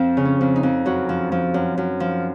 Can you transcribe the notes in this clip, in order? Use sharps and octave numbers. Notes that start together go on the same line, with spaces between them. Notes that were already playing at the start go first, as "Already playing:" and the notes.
Already playing: F2 F3 C4
C#3
C#4
F2
D#4
F2
F#2 F#4
F3
F3
F#2
F#2
F3